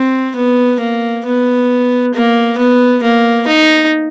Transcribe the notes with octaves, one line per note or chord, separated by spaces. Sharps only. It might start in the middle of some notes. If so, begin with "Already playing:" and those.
Already playing: C4
B3
A#3
B3
A#3
B3
A#3
D#4